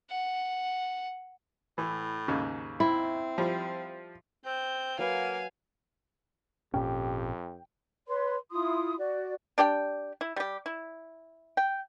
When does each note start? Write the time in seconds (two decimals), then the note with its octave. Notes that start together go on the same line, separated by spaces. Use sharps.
0.10 F#5
1.78 A2 E3
2.28 D#2 G#2 C#3
2.80 C4 E4
3.38 F3 G3
4.45 C4 G6
4.99 F#3 A#3 B4 F5 G#5
6.74 G#1 F2 A#2 C#4 G4 G5
8.07 B4 C#5 C6
8.51 E4 F4 C6 D#6
8.98 F#4 D5
9.58 D4 G4 D5 G5
10.21 E4
10.36 G3 G4
10.66 E4
11.57 G5